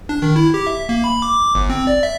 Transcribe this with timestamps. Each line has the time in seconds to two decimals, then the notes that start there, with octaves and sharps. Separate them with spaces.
0.09 D4
0.22 D#3
0.36 E4
0.54 G4
0.67 E5
0.89 A#3
1.04 B5
1.22 D6
1.55 G1
1.70 C4
1.87 D5
2.03 E5